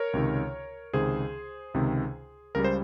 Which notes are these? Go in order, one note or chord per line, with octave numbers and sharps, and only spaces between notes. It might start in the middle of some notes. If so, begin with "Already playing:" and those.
Already playing: A#4 C#5
C#2 C3 D#3
C#2 C3 D#3 G#4 C5
C#2 C3 D#3
C#2 C#3 G3 A#4
C5